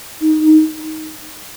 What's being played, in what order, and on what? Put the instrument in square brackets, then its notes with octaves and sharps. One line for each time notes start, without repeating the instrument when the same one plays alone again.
[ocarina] D#4